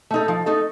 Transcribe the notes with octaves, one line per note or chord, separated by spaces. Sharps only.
A3 D#4 A4
F3
A3 D#4 A4